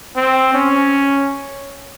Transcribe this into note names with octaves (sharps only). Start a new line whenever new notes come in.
C4
C#4